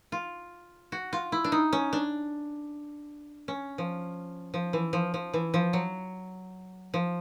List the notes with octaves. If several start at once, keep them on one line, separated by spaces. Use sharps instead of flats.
F4
F#4
F4
E4
D4
D#4
C#4
D4
C#4
F3
F3
E3
F3
F3
E3
F3
F#3
F3